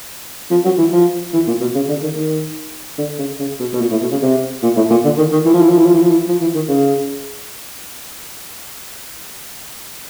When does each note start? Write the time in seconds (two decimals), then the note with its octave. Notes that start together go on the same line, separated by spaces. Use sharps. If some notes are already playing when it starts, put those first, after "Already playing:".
0.51 F3
0.65 F#3
0.78 E3
0.92 F3
1.33 E3
1.47 A#2
1.61 B2
1.75 C#3
1.89 D3
2.02 D#3
2.16 D#3
2.98 D3
3.19 C#3
3.39 C#3
3.59 B2
3.73 B2
3.81 A#2
3.91 A2
4.01 B2
4.11 C#3
4.22 C3
4.63 A#2
4.76 A2
4.90 A#2
5.04 D3
5.17 D#3
5.32 D#3
5.45 E3
5.53 F3
5.61 E3
5.69 F3
5.78 E3
5.86 F3
5.94 E3
6.02 F3
6.10 E3
6.28 F3
6.41 E3
6.55 D#3
6.69 C#3